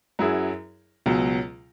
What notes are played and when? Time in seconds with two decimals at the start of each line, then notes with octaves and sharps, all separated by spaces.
0.19 F#2 F#3 E4 G#4
1.06 C#2 B2 F#3